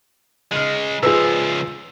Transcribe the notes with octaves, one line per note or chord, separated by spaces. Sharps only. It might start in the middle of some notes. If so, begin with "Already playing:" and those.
C#3 G#3 D#5 F6
C#2 F3 F4 G#4 B4 E6